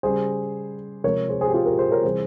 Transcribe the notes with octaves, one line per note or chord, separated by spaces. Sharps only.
C#3 G3 G#4 C5
C3 F3 G#3 A#4 C#5
G#4 C5
G#4 C5
G4
F4 G#4
G4 A#4
G#4 C5
A#4 C#5
C3 E3 G3 G#4 C5